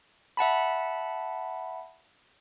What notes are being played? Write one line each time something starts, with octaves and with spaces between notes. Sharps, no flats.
E5 F#5 A5 B5